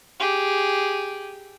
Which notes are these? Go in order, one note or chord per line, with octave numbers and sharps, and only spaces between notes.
G4 G#4